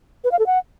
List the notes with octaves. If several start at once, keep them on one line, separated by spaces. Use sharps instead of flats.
B4
F5
A4
F#5